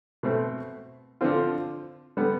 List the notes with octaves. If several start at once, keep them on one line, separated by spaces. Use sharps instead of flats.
B2 A3 C4
D3 F3 C4 F4
D3 G3 B3